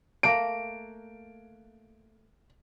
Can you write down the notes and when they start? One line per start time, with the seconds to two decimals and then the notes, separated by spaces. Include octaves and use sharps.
0.23 A3 A#3 A#4 D7